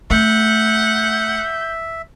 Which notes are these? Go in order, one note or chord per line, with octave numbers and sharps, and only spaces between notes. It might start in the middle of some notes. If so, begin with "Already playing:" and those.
A3 E5 F#5 G6